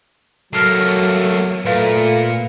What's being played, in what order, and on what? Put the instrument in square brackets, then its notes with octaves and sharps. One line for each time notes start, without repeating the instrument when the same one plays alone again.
[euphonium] F#3 [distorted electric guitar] A3 A#3 [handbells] F6 C7
[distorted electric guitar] A#2 [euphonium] A3 [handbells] B4 F5